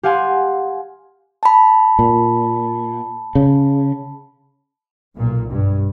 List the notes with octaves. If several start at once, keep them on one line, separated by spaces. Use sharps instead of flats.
G4 F5 F#5 G#5 C6
A5 B5
A#2
C#3
B1 A#2
G2